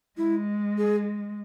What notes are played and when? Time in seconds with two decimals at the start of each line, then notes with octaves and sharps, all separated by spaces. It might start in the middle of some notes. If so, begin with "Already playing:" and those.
0.18 G#3 E4
0.78 G#4